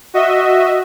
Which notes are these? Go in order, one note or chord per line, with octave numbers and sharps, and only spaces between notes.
F#4 D#5 E5